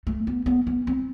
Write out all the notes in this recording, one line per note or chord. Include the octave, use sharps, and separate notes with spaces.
A3
B3
B3
B3
C4